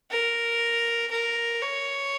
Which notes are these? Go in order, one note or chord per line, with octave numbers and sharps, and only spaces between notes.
A#4
A#4
C#5